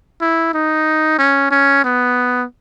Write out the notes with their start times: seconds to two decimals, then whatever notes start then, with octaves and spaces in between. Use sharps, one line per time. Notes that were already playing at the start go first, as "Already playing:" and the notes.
0.21 E4
0.54 D#4
1.19 C#4
1.51 C#4
1.84 B3